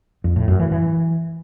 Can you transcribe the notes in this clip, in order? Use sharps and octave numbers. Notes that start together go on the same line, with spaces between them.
F2
A2
F#2
E3
E3